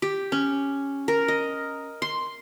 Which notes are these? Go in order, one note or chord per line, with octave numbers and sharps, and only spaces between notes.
G4
C#4
A#4
D#5
C6